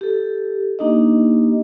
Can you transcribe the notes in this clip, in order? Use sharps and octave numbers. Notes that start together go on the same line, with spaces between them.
G4 A4
A#3 D4 D#4 G4 D#5